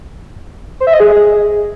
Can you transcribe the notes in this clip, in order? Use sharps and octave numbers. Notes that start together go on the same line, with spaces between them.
C5
E5
D#5
G#4